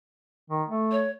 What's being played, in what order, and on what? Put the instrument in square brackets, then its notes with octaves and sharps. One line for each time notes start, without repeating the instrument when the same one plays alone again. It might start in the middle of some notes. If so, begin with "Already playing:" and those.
[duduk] D#3
A3
[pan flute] C#5